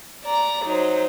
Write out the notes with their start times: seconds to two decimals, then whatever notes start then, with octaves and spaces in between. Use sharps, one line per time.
0.24 D5 A#5
0.64 F#3 D#4 C5